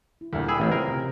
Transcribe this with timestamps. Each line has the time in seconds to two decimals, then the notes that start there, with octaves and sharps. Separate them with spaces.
0.21 E4
0.33 D2 A#2 G3 A#4 D5
0.48 G#4 G5 B5 E6
0.60 A1 A3 C4 C#4
0.71 C#3 F4 A#4 C5
0.88 C3 G4